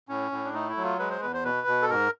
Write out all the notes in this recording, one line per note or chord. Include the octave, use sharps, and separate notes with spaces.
A2 C#4
A2
D4
A3 D#4
E4
F#3
F4
G#3 B4
C5
E2 B4
C5
B2 B4
B2
A4
G#2 A#4